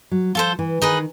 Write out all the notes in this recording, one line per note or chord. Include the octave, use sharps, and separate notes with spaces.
F#3
F3 F4 A4 C5
E3
D#3 D#4 G#4 B4